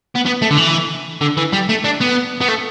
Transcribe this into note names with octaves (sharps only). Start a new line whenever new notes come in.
B3
B3
A3
D3
E3
D3
E3
G3
A3
D4
B3
B3
A3